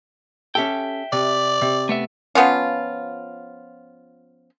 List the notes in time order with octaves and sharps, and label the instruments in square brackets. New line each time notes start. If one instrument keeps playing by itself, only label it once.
[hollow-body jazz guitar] C#4 G4 A4 [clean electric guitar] E5 G5
[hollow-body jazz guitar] C3 [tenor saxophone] D5
[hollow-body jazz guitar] C3
[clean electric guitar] A3 B3 E5
[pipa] F3 B3 C#4 F4